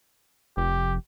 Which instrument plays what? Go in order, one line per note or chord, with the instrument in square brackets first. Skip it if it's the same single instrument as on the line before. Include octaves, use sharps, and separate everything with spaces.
[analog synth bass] F1 [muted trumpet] G4